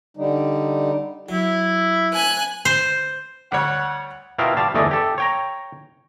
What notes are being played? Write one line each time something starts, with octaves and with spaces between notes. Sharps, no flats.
D3 G3 D#4
F#3 E4
G#5 F#6
C5
D2 G3 C#5 F#5
B2 E4 F4 A#4 F5 G5
G3 F5 A5
G1 E2 A3 D5 D#5 G#5
G4 A4
C#5 G5 A#5